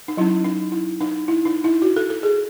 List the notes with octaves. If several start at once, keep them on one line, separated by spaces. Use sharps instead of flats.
D#4
F#3 C#4 E4
D#4
E4
D#4
E4
D#4
E4
F#4
A4
A4
G#4